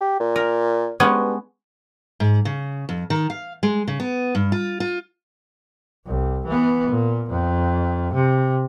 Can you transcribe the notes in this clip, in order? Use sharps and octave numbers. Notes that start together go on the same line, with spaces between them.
G4
A#2
A#4
G2 G#3 B3 C#4
G#2
C#3
F2
D#3
F5
G#3
C#3
B3
G2
F4
F4
C2
E3 B3
A#2
F2
C3